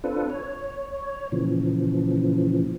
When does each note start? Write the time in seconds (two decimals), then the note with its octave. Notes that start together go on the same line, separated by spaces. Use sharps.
0.04 C4 D4 F4 A4 B4
0.30 C#5
1.32 A#2 C#3 E3 F3